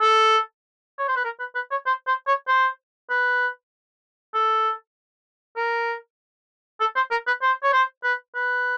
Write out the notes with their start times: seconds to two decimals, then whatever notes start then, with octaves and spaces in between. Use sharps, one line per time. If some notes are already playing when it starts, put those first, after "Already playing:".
0.01 A4
0.99 C#5
1.08 C5
1.16 B4
1.25 A#4
1.40 B4
1.55 B4
1.71 C#5
1.86 C5
2.07 C5
2.27 C#5
2.48 C5
3.10 B4
4.34 A4
5.57 A#4
6.80 A4
6.96 C5
7.11 A#4
7.27 B4
7.42 C5
7.64 C#5
7.73 C5
8.04 B4
8.35 B4